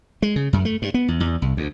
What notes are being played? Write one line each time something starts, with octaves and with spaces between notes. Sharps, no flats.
G#3
C#3
F#2
A3
G2
B3
E2
E2
C2
D2